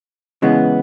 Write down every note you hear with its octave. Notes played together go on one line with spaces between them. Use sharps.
C#3 E3 G#3 B3